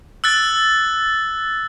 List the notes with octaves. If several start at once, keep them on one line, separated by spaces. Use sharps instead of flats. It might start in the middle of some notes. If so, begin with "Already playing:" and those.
E6 F#6 A6